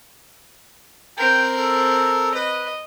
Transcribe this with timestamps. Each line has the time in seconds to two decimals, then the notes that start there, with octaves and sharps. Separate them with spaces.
1.18 C4 A#4 G5
1.57 A4
2.34 B4 D#5